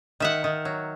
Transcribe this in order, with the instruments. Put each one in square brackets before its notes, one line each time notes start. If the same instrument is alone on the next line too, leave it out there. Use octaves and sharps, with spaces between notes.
[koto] D#3 E5 F#5
D#3
F#3